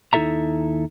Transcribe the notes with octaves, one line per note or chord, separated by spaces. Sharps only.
D#2 D#4 E4 A4 E5 A#5